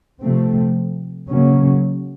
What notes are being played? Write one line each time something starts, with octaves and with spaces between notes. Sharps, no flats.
C3 F3 A3 C4
C#3 F#3 A#3 C#4